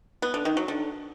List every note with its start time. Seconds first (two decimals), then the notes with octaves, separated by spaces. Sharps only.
0.22 B3
0.34 D3
0.45 D#3
0.57 F#3
0.68 D3